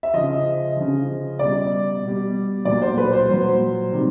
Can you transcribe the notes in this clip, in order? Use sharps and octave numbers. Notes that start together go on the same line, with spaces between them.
E5
C#3 F3 D#5
C#3 F3
B2 G3 D5
B2 G3
A#2 F#3 D5
C5
B4
C5
A#2 F#3 C5
C3 D#3 G3